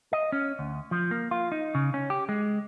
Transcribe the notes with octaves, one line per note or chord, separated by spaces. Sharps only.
D#5
C#4
D2
F3
A#3
F4
D#4
C#3
C#4
G4
G#3